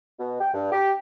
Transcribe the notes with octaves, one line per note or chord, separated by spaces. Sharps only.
B2
G5
G2
G4